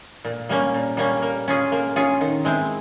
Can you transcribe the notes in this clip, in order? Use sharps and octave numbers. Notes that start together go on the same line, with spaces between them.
A#2
G3 A#3 C#4
A#2
G3 A#3 C#4
A#3
C#4 F4 G#4
A#3
C#4 F4 G#4
D#3
G#3 C4 E4